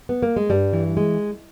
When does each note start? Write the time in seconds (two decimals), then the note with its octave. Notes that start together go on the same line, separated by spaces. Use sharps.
0.09 B3
0.23 A#3
0.36 G#3
0.50 G2 G3
0.73 E3
0.97 G#3